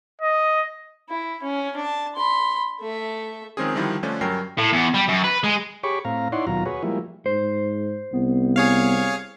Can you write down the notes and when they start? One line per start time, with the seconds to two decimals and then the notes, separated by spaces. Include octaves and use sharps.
0.22 D#5
1.09 E4
1.43 C#4
1.76 D4 A5
2.16 B5 C6
2.81 A3 E5
3.57 D#3 F3 G#3 C4 C#4 G#4
3.75 D3 D#3 F3 G3 E4
4.03 D3 F3 A3 C#4 D4
4.21 G2 F#3 C#4 A#4 G5 C7
4.58 A2
4.72 E2
4.94 G3
5.08 F#2
5.24 B4
5.44 G#3
5.83 G4 G#4 C#5 B5 C#6 D6
6.05 A2 C4 F5 A#5
6.32 D#4 E4 C#5 D5 F#5 C6
6.47 D#2 B2 F#3 F4 A#5
6.66 F#4 G#4 B4 C#5
6.83 F3 G3 G#3 A#3 E4
7.26 G#2 C5
8.13 C2 B3
8.56 G#4 C#5 F5